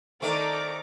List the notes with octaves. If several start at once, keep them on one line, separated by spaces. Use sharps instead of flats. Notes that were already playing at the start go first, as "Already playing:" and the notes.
D#3 A3 C4 A4 D5 A#5 D6